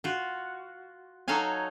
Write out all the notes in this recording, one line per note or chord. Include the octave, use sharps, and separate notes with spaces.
F4 F#4
F#3 D#4 A4 C#5 F5 G#5